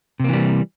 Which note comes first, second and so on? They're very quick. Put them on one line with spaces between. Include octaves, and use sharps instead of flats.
C3 A#3 E3 G3